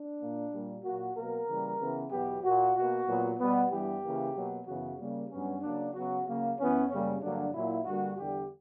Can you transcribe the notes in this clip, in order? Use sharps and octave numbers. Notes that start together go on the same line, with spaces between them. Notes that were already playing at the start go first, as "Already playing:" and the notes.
Already playing: D4
A#2 A#3
A#2 G3 A#3
A#2 F#3 A#3 F#4
B2 F#3 A#3 A#4
C#3 E3 G3 A#3
C#3 E3 B3
E2 B2 F#3 B3 G4
A#2 A#3 F#4
B2 A#3 F#4
A#2 F#3 B3
B2 G3 B3
G2 E3 G3 B3 G4
C#3 E3 A#3
B2 F#3 A#3
F#2 C#3 E3 B3 F#4
C#3 G3 A#3
G2 F#3 B3 C#4
C#3 F#3 A#3 D4
C#3 F#3 B3 F#4
C#3 F#3 A#3
F#2 E3 B3 C#4
F#2 C#3 G3 A#3 C#4
G2 D3 F#3 A#3 D4
A#2 F#3 A#3 E4
G2 D3 G3 A#3 F#4
E2 D3 G3 G4